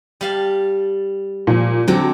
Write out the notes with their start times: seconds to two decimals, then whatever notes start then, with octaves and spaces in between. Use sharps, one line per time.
0.21 G3 F5 A5
1.47 A#2 F3
1.88 D3 F#3 C4 C5